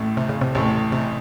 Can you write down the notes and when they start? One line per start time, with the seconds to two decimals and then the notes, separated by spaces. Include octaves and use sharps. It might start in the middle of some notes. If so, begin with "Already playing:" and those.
Already playing: A1 A2 A3
0.17 C3
0.29 C#3
0.41 C3
0.55 A1 A2 C3 A3
0.92 C3